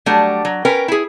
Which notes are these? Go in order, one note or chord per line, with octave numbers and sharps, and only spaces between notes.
F#3 G3 A3 D4
F#3
C#4 A#4 B4 G5
E4 G#4